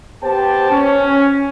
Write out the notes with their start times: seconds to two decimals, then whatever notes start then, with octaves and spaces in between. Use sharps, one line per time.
0.22 B3 G4 C5 G5 A5
0.71 C#4